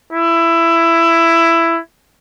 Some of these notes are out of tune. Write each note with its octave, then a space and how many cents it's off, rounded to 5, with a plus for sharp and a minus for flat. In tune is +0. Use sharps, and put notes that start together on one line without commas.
E4 +15